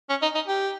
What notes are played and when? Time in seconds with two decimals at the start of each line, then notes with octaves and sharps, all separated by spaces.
0.10 C#4
0.22 D#4
0.35 D#4
0.47 G4